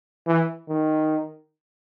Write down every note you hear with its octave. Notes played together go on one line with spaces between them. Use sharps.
E3
D#3